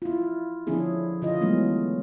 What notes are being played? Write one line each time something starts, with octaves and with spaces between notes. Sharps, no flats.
E4 F4
D3 F3 C#4 D4 E4 G#4
D3 F4 D#5
E3 F#3 G#3 A3 B3 C#4